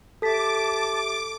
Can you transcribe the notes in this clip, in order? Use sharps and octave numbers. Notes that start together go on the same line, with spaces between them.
G4 A4 E5 A5 D6 B6